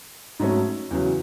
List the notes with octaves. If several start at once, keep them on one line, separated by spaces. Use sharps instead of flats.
G#2 F#3 A3 C#4
E2 C#3 F#3